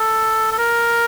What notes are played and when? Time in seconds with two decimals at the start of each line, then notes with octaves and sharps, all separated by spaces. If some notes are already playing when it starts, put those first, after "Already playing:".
Already playing: A4
0.52 A4
0.58 A#4